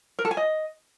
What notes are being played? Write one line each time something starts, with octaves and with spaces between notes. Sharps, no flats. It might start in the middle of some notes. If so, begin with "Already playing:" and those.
A#4
A4
G#5
D#5